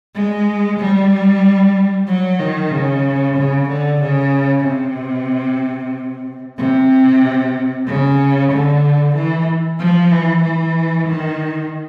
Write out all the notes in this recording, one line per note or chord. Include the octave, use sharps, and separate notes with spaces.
G#3
G3
F#3
D#3
C#3
C#3
D3
C#3
C3
C3
C#3
D3
E3
F3
E3
E3
D#3